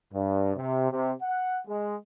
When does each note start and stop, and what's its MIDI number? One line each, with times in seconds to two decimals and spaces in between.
0.13 0.52 43
0.56 0.88 48
0.90 1.12 48
1.22 1.59 78
1.67 1.95 56